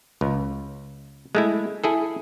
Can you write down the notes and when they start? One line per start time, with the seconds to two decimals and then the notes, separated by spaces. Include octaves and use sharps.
0.21 C#2
1.35 G#3 A3 E4
1.84 E4 G#4 A4